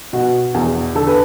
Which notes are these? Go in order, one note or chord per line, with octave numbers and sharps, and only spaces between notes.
B2 F#4
E2
D3 A4
B4